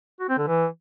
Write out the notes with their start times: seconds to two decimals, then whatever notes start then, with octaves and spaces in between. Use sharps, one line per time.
0.20 F#4
0.29 C4
0.38 D3
0.47 E3